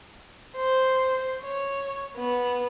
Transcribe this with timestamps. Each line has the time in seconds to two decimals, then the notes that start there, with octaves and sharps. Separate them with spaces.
0.56 C5
1.42 C#5
2.17 B3